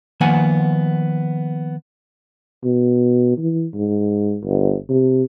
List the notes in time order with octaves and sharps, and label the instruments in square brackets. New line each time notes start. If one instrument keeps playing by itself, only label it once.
[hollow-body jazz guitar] D#3 F3 A#3 B3 F#5 G#5
[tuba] B2
E3
G#2
G1
C3